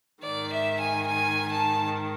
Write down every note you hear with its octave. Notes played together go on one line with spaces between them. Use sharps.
G#2 D#3 D5
E5
G#5
G#5
A5